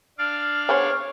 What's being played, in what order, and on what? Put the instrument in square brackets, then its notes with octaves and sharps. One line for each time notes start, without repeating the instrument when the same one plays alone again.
[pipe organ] D4 D5 F5 [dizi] F6
[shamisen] B3 G#4 C5 [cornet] C#5